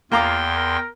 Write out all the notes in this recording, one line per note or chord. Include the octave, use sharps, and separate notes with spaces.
E2 A#3 F4 G5 A#5 C6 D6
A#4